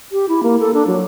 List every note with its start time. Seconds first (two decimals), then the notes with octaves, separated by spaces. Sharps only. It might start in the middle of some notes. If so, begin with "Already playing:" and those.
0.12 G4
0.29 E4
0.43 A#3
0.60 A4
0.74 D4
0.87 F#3